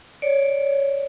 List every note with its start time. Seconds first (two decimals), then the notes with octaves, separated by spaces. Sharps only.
0.22 C#5 D5